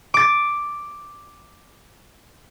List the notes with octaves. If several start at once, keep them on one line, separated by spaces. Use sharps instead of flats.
D6 A6